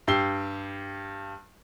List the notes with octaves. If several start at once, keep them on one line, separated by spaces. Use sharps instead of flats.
G2 G4 E6 C7 G7